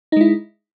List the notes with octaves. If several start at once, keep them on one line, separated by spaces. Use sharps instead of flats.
G#3 D#4 E4